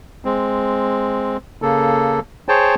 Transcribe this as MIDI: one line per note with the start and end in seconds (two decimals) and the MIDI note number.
0.25 1.37 56
0.25 1.37 60
1.62 2.20 49
1.62 2.20 58
1.62 2.20 69
2.49 2.75 68
2.49 2.75 72
2.49 2.75 73
2.49 2.75 79
2.49 2.75 81